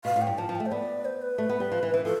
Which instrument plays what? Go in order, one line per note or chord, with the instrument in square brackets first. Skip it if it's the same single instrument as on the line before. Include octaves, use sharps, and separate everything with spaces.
[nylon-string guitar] B2 [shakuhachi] F5
[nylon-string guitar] A2
[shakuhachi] G5
[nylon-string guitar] G2
[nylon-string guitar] F3 [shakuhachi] A5
[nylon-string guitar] F3
[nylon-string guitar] A3 [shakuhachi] G5
[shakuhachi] C5
[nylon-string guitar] B3 [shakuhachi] D5
[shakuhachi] C5
B4
[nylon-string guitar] A3
B3
G3
F3
E3
E3
[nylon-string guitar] F3 [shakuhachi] A4